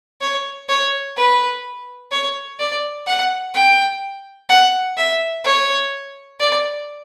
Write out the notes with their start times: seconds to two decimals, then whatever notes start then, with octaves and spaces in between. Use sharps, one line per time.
0.21 C#5
0.69 C#5
1.17 B4
2.11 C#5
2.60 D5
3.07 F#5
3.54 G5
4.49 F#5
4.97 E5
5.45 C#5
6.40 D5